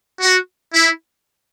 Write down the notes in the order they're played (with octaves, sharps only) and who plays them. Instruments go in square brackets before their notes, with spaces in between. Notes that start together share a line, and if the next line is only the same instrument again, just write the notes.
[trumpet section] F#4
E4